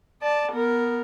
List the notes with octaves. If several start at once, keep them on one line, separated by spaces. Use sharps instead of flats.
D5 A5
B3 A#4